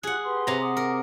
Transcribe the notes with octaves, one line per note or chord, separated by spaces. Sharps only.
F4 G4 G#4 F#5 F#6
G4 B4 C6
C3 A#5
F#5 D6 D#6
A#4